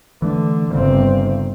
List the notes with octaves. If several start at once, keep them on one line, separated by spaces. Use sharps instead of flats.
D3 E3 A3
G1 C#3 C4